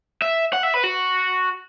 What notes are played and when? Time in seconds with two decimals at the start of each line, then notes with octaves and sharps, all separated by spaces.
0.22 E5
0.53 F#5
0.63 E5
0.74 B4
0.84 F#4